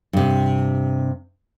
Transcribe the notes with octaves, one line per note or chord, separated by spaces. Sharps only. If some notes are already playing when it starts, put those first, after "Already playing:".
G2 C3